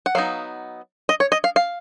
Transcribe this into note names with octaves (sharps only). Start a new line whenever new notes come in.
F#5
F#3 B3 D#4 F5
D#5
C#5
D#5
F5
F5